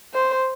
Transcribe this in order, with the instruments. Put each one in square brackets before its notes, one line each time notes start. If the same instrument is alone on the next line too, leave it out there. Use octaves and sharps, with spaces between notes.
[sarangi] C5